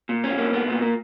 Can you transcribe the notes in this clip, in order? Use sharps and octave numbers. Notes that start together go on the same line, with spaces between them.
A#2
B1 C#4
A#3
B1 B3
A#2
A#3